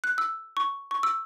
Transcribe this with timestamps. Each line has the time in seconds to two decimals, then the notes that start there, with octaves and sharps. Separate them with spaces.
0.04 F#6
0.18 E6
0.57 C#6
0.91 C#6
1.03 E6